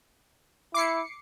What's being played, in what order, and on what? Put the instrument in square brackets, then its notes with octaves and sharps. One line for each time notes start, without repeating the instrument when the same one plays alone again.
[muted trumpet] E4 [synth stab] D6 C7 C#7